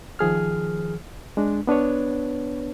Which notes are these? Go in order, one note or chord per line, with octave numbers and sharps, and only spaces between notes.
D#3 F3 G#4 F6
G#3 D4
B3 D4 B4 C#5